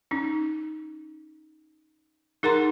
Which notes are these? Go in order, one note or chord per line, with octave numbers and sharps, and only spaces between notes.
C#4 D#4
D#4 G#4 A#4 F#5 A#5 C6